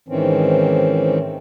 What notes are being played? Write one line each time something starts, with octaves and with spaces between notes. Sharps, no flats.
G#2 D#3 E3 C4 C#4